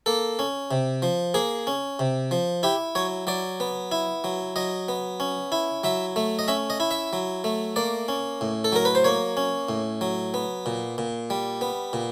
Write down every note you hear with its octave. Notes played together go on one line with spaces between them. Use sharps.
A#3 A4
C#4
C3
F3
A#3 G#4
C#4
C3
F3
E4 G4
F#3 C#5
F#3 D5
B3
E4
F#3
F#3 D#5
B3
C#4
E4
F#3 E5
A3
D#5
C#4 E5
D#5
E4
E5
F#3
A3
A#3 D5
C#4
A2
A4
F#3 A#4
B4
C5
A#3 C#5
C#4
A2
F#3
B3
A#2
A#2
G3
B3
A#2